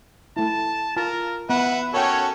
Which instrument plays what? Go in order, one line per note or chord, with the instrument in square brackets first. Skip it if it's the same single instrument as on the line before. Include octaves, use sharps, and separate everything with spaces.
[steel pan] A3 E4 [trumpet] A5
[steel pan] F4 A5 [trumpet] A#4
[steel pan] B3 [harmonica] B4 E5 [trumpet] F#5
[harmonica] C#4 F#4 A4 [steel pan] A#4 G5 [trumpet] C#5